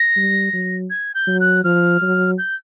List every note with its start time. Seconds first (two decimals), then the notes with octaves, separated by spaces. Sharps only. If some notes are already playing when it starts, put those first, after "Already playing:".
Already playing: A#6
0.16 G3
0.53 F#3
0.90 G#6
1.15 G6
1.27 F#3
1.40 F#6
1.64 F3 F6
2.02 F#3
2.38 G6